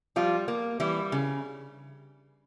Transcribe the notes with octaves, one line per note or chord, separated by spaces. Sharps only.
F3 G3 F4
A#3
E3 G3 E4
C#3